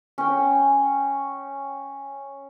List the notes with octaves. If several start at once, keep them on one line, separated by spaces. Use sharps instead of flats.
C#4 G5